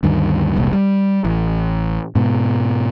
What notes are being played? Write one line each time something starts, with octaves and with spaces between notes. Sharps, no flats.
D2 G2 D#3
E1 C2 A#2
G3
A1
G#2 B2